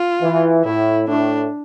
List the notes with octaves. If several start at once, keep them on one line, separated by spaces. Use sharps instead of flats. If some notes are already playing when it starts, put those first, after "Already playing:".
Already playing: F4
E3
A2 E4
A2 D4